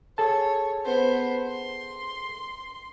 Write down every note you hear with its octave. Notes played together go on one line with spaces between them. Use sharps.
G#4 A4 C#5 A5
B3 C5
C6